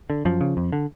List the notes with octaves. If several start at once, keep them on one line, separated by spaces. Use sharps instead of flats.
D3
F#2 F3
C#3
F2
D3